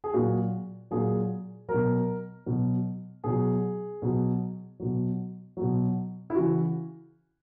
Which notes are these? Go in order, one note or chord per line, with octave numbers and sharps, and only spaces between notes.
G#4
A#2 F#3 F#4
A#2 F#3 G#4
B2 F#3 A#4
B2 F#3
B2 F#3 G#4
B2 F#3
B2 F#3
B2 F#3
E4
C#3 E3 F#4